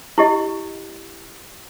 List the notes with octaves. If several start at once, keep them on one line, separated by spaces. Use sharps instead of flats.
E4 G4 D#5